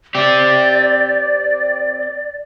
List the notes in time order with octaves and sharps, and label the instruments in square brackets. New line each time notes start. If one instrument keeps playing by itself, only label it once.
[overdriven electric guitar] C4 G4 [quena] D5